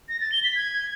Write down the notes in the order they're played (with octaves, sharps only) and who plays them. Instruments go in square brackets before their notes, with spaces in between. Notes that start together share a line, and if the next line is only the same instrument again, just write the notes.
[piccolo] A#6
A6
G7
B6
G#6